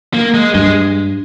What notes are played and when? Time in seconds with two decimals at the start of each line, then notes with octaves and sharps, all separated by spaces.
0.14 A#3
0.34 G#3
0.54 G2 G#3